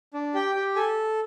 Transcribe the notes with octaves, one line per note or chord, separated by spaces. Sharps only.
D4
G4 G5
G4
A4 G#5